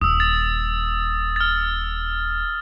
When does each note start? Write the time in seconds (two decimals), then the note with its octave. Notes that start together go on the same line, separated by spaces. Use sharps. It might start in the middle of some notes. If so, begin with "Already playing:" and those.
0.01 D#1 D#6 E6
0.20 A6
1.36 F6 A6